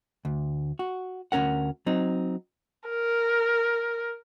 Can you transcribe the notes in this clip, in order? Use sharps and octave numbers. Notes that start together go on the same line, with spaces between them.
D2
F#4
D2 G#2 C#4 A#4 F#5
F#3 C4 D#4
A#4